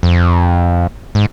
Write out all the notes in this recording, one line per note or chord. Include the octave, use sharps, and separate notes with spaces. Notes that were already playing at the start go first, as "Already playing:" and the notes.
F2
G#2